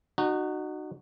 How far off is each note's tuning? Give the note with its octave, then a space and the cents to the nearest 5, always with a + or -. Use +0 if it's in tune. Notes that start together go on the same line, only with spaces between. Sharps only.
D#4 -35 F#4 +5